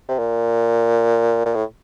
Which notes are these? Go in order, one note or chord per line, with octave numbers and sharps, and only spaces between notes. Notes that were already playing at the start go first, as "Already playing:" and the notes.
C3
A#2
A#2
A2